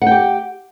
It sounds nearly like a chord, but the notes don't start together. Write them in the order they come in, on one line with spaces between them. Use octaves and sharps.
F#5 G5 G4